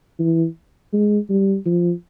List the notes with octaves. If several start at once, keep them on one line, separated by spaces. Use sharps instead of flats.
E3
G#3
G3
F3